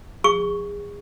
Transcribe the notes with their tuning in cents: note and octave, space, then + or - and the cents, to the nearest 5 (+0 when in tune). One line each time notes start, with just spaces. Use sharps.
G#4 -30 C#6 +0